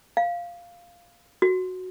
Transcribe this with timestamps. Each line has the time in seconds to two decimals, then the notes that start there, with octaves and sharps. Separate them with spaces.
0.17 F5
1.42 F#4